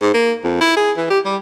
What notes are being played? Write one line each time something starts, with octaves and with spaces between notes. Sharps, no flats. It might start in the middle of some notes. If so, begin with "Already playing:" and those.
G#2
A#3
F2
E4
G#4
E3
G4
G3